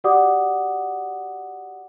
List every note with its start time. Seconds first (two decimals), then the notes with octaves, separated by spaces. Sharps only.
0.04 F#4 G4 D5 F#5 D6 D#6